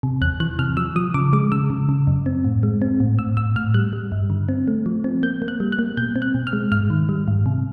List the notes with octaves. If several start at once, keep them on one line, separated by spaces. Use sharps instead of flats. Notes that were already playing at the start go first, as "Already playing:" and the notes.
C3
E2 F#6
E3 F#6
C3 F6
F3 E6
F3 D#6
C#3 D6
G#3 D6
C#3 E6
C#3
C#3
F#2
C4
A2
G#3
C4
A2
A2 E6
A2 E6
A2 F6
G3 F#6
G3
G2
D3
C4
A3
F3
C4
A#3 G6
A#3
F#6
G3
F#6
A#3
B2 G6
C4
F#6
B2
F6
G#3
G#2 F6
D#3
G3
G#2
C3